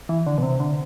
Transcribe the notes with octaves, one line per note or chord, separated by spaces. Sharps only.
E3
D3
B2
C3
D3